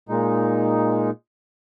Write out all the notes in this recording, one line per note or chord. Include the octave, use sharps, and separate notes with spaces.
A#2 G#3 D#4